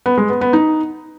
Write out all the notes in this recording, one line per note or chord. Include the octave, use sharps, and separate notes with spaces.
B3
G#3
B3
B3
D#4